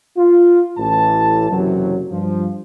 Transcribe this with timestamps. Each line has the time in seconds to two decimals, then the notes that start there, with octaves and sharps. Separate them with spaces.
0.17 F4
0.78 A1 A2 E3 A5
1.50 F#1 F#2 C3 E3 F#3
2.10 G2 F3